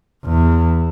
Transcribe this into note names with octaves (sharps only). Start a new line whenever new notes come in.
E2